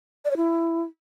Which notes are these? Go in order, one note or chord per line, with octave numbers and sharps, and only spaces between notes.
D5
C#5
E4